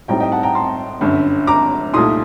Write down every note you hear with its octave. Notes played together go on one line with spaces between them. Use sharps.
A2 G3 C4 D#4 G5 A#5
D#5 G5
F#5 A5
G5 A#5
A5 C6
G1 F#2 D3
A#5 D6
C2 A#2 A3 D#4 C6 D#6